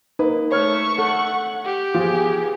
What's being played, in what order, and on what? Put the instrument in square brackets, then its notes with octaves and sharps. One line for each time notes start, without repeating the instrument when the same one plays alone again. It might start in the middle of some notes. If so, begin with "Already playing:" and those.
[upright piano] A#3 B4 [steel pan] D#4
[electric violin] A3 C#6 [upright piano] C#5 F6
[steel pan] A4 [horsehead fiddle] F#5
[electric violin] G4
[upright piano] F3 [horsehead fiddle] B3 G#4